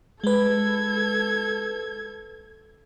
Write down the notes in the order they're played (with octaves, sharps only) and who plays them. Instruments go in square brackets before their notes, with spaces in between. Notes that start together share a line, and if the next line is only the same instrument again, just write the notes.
[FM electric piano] G#3 B4 [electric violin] A4 G#6